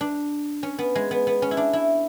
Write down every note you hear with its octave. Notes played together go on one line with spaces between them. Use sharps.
D4
C#4
B3
G#3
B3
B3
C#4
E4
D4
E4